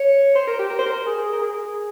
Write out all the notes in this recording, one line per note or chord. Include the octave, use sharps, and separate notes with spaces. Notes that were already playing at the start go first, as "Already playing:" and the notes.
Already playing: C#5
C5
A#4
G4
A#4
C5
A#4
G#4
A#4
G#4